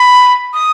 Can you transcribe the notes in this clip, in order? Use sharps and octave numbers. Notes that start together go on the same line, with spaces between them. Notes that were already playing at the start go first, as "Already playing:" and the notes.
Already playing: B5
D#6